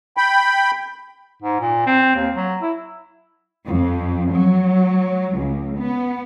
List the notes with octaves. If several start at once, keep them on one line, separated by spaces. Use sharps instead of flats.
G5 B5
G#2
A#2
C4
D#2
F#3
E4
F2
F#3
C#2
B3